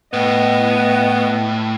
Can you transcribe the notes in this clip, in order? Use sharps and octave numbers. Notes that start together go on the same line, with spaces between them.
A2 B3 D#5